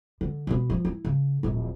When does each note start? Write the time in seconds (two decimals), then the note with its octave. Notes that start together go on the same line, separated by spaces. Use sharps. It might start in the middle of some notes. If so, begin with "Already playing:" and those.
0.21 D3
0.47 B2 B3
0.70 F3
0.85 E4
1.05 C#3
1.43 D1 A#1